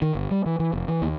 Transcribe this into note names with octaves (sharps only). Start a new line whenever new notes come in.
D#3
G1
G3
E3
E3
F1
E3
D#2